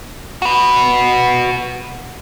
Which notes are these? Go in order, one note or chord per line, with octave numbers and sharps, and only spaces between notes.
F#4 B4